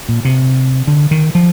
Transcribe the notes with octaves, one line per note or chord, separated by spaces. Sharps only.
A#2
C3
D3
D#3
F3